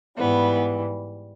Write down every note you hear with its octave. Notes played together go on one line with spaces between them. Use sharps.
G#2 E3 G3 B3